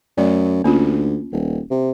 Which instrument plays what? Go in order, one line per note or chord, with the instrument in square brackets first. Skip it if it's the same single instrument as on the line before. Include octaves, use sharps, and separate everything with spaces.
[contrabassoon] F#2 [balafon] A3 D5
[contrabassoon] D2 [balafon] A#3 C#4 F4
[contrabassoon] D#1
C3